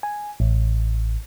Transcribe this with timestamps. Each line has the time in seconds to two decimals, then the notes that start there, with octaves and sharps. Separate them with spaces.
0.03 G#5
0.40 A1